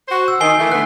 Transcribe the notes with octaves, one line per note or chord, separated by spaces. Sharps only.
F#4 C5
E6
D#3 G#5 C7 G7
E3 A3
D3 A3 B3 F#6